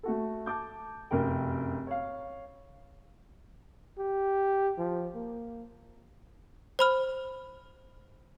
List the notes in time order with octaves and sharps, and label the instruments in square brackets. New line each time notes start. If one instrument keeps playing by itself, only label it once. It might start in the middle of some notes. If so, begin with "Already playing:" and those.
[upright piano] A3 F#4 A4
A5 D6 G6
F1 F#2 A#4 G5
C#5 F5
[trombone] G4
F3
A#3
[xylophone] C5 B5 F6